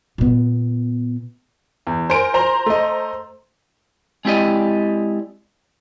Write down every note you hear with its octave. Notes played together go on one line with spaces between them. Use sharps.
A#2 B3
E2
A#4 C5 G#5 D7
C5 A#5 C6
A3 D#5
G#3 C4 E4 G4 D5 D#5